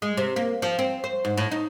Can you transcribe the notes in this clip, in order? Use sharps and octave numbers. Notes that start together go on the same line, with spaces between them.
G#3
C3
A#3
F3
C4
C5
G#2
A2
D#4